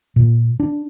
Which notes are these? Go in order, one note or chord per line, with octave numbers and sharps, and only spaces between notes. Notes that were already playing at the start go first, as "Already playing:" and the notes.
A#2
D4